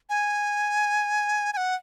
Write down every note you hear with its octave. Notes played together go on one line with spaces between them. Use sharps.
G#5
G#5
F#5